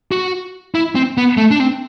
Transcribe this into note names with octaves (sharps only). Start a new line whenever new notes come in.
F#4
E4
C4
B3
A3
D4
C4